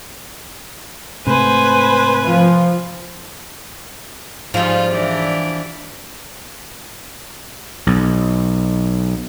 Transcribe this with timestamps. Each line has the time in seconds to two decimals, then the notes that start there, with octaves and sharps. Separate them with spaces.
1.26 G#2 C3 A3 B4 C5 G#5
2.25 F3 F4
4.54 G#2 F3 G3 D#4 F4
4.92 E3 D4
7.87 B1